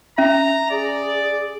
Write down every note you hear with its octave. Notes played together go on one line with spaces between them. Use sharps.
C#4 E5 A#5
G#4 D5